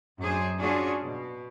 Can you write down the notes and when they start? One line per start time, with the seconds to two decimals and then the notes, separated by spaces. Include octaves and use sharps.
0.19 F#2 D4 G#4 C5
0.59 C#4 D4 F4 F#4 G#4
1.01 B2